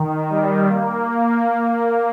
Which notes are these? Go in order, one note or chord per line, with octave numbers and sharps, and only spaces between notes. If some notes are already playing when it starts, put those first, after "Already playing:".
Already playing: D#3
G3
A#3